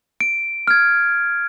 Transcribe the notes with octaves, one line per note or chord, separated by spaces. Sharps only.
D7
F6 G#6